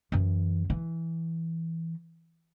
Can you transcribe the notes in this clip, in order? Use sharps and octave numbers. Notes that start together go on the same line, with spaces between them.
F#2 E3
E3